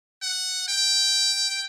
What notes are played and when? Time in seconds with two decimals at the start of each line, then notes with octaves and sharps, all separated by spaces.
0.22 F#5
0.68 G5